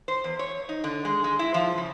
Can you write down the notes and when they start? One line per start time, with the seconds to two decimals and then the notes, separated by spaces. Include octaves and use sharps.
0.08 C5
0.24 E2
0.39 C#5
0.69 D#4
0.84 D3
1.05 G#3
1.24 G#3
1.39 E4
1.54 F3
1.78 C#3